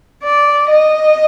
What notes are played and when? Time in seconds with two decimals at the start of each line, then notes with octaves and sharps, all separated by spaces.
0.24 D5
0.70 D#5